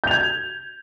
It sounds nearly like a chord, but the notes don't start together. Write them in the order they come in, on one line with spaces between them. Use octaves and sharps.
G6 F7 G#6